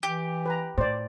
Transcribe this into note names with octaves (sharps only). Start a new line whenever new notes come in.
E3 G4
B4 A#5
A2 C5 D5